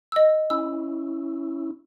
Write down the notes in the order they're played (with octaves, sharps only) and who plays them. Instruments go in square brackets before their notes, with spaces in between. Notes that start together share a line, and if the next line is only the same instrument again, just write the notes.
[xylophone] D#5 E6
[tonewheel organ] C#4 E4 [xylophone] E6